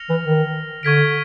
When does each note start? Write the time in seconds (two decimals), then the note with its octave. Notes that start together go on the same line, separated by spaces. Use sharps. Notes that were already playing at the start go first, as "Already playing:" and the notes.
Already playing: F6 A#6 C#7 F7
0.09 E3
0.24 D#3
0.83 D3 C#6 F6 G#6 B6 D7